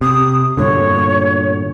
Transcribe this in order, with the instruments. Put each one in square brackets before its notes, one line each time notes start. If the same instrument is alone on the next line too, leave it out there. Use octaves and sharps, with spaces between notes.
[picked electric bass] C3 [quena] D#6
[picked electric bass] G2 A#2 D3 [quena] C#5